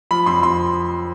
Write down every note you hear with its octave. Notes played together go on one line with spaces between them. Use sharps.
F3 B5
F2 C6
F2 C6